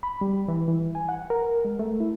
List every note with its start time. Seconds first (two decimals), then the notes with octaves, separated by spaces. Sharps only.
0.03 B5
0.21 G3
0.48 E3
0.68 E3
0.95 G#5
1.09 F#5
1.30 A#4
1.65 G#3
1.79 A3
2.00 E4